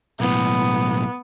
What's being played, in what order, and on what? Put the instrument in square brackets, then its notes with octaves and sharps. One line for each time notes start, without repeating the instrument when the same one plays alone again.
[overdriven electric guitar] B1 A2 [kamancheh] B3